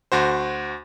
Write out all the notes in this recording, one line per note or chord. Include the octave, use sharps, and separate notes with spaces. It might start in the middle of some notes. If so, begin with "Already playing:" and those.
D2 F#4 C5